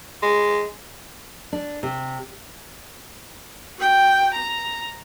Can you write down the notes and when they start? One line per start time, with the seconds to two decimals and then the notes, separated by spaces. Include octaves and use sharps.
0.22 G#3
1.53 D4
1.83 C3
3.75 F#4 G5
4.33 A#5